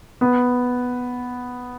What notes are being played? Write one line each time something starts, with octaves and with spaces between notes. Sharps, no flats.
B3